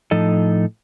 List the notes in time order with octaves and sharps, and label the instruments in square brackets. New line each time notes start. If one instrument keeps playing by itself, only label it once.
[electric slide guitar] A2 F3 D#4 A4 D#5